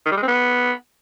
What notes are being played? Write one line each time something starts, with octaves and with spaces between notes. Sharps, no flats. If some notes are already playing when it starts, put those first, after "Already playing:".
D#3
G3
G#3
C4
B3